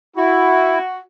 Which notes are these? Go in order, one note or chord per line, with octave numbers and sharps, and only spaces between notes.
E4 F#4